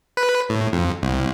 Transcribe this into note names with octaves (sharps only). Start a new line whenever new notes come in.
B4
A2
F2
C2